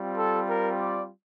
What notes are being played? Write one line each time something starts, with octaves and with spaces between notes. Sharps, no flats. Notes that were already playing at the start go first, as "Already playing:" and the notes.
Already playing: G3 C4 F4
A4
A#4
D5